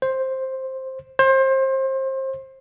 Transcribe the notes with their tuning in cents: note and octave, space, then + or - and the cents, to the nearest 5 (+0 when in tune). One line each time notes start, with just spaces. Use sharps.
C5 +10
C5 +30